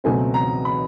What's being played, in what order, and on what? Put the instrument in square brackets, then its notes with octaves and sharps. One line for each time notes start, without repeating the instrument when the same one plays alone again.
[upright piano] C#2 B2 F#3 A3 C4 G#5
A#5
B5